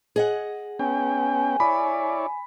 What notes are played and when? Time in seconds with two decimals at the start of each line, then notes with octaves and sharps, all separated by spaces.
0.16 G#4 D#5 F#5
0.79 B3 C#4 G5 G#5
1.60 E4 C#5 D5 B5